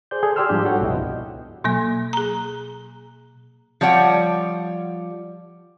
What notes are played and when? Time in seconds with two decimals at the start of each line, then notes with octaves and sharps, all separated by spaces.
0.11 G#4 C5 D5 G6
0.23 G#4 A4
0.36 G4 D5 G5 C6 E6 F6
0.49 G#2 F3 G3 D4 G4 G6
0.65 F#4 A4 C#5 F#5 G5
0.81 C2 G2 B2 E4 D#5
1.64 B2 F#3 A#3
2.13 G#4 A#5
3.81 F3 G3 C#5 F#5 G5